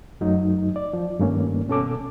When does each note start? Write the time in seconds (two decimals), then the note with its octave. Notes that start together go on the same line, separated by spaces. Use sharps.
0.21 F#2 F#3 A3 D#4
0.76 D5
0.93 F3
1.19 G2 D#3 A3 A#3 C#4
1.68 B2 C#4 A4 D6